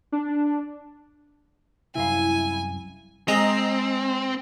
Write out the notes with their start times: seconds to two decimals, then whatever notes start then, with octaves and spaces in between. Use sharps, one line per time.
0.12 D4
1.95 C2 F#2 E4 F5 G#5
3.28 G#3 C4 D#5 A#5